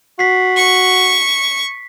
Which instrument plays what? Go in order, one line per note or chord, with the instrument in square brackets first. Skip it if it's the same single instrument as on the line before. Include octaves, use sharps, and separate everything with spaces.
[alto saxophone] F#4 [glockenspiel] B6 C7
[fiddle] C#6